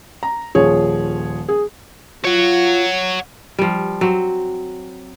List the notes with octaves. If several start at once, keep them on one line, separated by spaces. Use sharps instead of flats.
A#5
D#1 F3 G#4 C#5
G#4
F4 C#5 F#5
F3 G3
F#3 C4